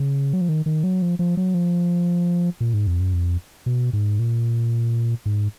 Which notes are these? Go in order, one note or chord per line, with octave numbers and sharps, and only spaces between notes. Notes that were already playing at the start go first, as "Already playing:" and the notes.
Already playing: C#3
F#3
F3
D#3
D#3
F#3
F3
F3
F#3
F3
A#2
G#2
F2
F#2
F2
B2
G#2
A#2
G#2